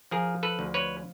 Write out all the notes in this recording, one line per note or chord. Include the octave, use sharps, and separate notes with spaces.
F3 G#4 A#4
A4 B4
D2
B4 C#5